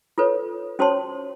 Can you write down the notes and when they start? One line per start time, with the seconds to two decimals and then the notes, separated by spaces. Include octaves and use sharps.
0.18 F4 A4 B4 C#5
0.79 C#4 F#4 C5 C#5 A5 C6